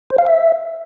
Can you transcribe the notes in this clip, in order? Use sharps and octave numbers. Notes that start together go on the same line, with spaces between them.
C5
F5
E5